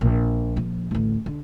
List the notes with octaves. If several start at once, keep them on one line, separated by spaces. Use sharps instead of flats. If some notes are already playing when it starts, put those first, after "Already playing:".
A#1 A#2
A#1 F3
A1 D2
D3